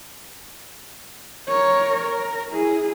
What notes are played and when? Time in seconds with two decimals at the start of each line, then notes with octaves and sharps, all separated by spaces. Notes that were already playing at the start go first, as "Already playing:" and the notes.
1.48 A#4 C#5
2.03 A#4
2.51 E4 G#4